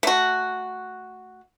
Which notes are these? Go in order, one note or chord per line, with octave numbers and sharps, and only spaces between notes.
A3 F#4